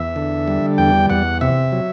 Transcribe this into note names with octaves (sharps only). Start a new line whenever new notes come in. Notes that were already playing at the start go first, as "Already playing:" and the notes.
Already playing: E2 E5
D3
G3
E2 G5
E2 F#5
C3 E5
F#3